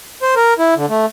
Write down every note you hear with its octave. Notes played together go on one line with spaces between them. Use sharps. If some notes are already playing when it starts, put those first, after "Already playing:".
C5
A#4
E4
D3
A3